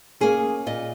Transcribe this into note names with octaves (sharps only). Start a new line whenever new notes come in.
A#3 C#4 G#4
A#2 D#5